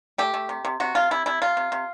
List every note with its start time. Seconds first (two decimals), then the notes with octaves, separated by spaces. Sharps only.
0.18 A3 G4
0.34 A3
0.49 C3
0.65 C3
0.80 C3 F#4
0.95 C3 F4
1.11 C3 E4
1.26 C3 E4
1.42 C3 F4
1.57 C3
1.72 C3